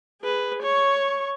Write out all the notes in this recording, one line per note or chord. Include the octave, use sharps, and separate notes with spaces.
G#4 B4
C#5 C#6